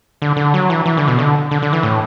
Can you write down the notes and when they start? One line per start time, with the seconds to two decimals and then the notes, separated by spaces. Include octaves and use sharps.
0.22 D3
0.37 D3
0.54 F#3
0.70 E3
0.86 E3
0.97 D3
1.08 B2
1.18 D3
1.51 D3
1.62 D3
1.73 E3
1.83 A2